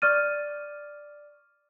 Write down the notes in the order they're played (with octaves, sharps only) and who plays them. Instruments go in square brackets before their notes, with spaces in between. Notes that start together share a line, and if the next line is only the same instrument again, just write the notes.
[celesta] D5 C#6 D6 F6 A6 D#7